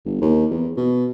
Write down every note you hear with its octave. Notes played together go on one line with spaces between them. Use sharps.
G1
D#2
E2
B2